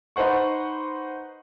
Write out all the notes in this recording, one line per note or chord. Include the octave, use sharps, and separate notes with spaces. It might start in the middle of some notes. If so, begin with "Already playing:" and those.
D#4 B4 C5 F#5 C#6